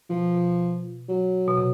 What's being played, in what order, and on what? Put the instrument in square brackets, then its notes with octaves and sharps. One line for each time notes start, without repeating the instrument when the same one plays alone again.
[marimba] B2 [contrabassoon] F3
[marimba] B2
[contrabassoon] F#3
[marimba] B2
C3